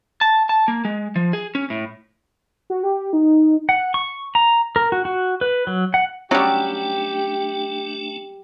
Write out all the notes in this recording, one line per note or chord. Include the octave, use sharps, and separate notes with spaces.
A5
A5
A#3
G#3
F3
G#4
C#4
A2
F#4
G4
D#4
F#5
C#6
A#5
A#4
F#4
F#4
B4
F#3
F#5
F#3 G3 A3 C#4 D4 G4